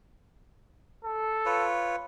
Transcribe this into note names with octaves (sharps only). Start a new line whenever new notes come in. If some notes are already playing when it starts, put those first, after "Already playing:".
A4
F4 B4 C#5